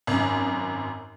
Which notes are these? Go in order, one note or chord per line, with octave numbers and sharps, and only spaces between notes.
G#1 F#2